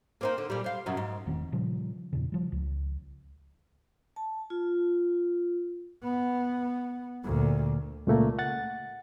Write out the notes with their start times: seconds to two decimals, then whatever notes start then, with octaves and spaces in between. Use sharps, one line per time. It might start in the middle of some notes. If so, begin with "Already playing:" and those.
0.21 A#3 C4 D#4
0.38 D3
0.50 A#2 G3
0.64 C5 F5
0.86 F#2 B2 F#3
0.97 G#2
1.26 E1 D#3 A3 C4
1.52 A#2 C#3 F3 G3
2.13 E2 A#2 C#3
2.32 F3 G3
2.52 C#2
4.16 A5
4.50 F4
6.03 B3
7.24 D2 A#2
8.07 C#2 A#2 A3 A#3
8.39 F#5 A6